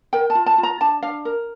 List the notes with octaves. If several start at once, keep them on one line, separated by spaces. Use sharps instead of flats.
A#4 G5
A5
F4
A5
F4
A#5
D4 A5
D4 F5
A#4